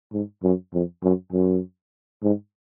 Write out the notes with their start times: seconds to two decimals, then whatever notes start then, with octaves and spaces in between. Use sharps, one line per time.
0.12 G#2
0.43 F#2
0.73 F2
1.03 F#2
1.33 F#2
2.23 G#2